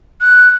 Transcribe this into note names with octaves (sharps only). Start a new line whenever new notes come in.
F#6